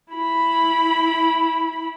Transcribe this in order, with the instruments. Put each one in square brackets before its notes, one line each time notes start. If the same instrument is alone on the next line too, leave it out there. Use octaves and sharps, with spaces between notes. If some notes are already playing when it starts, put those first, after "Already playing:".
[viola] E4 B5